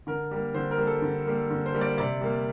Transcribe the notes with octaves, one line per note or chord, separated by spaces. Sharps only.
D3 A#4
G3 A#3
D3 C5
A#4
G3 A#3
A4
D3
G3 A#3
D3
C5
G3 A#3
D5
C3 D5
G3 A#3